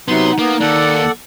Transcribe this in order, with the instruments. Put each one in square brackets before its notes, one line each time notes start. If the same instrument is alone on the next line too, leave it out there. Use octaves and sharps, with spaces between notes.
[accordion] C3 F#3 C6 [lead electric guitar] B3 [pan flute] D#4
[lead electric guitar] A#3 [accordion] B3
[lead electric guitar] D#2 A#3 [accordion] A4 D5 F#5